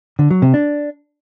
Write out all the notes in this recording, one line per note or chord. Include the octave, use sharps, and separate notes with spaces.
D3
F#3
C3
D4